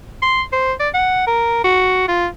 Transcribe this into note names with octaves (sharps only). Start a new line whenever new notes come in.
C6
C5
D5
F#5
A#4
F#4
F4